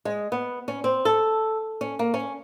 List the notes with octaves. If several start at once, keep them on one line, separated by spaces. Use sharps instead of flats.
G#3
B3
C#4
C4
A4
C#4
A#3
C#4